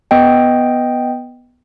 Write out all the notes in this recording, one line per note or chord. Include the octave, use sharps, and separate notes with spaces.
B3 D#5 G5